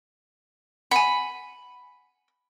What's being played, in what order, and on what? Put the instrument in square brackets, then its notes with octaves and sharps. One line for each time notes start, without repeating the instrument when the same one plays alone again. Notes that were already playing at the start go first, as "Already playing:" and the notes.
[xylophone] F#5 G#5 [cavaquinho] B5